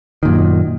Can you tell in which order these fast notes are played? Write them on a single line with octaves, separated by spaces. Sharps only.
D#3 A#2 F#2